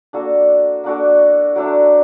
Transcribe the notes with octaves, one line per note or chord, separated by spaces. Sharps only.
A#3 D4 F#4 A4
A#3 D4 F#4 A4
F#3 A3 D4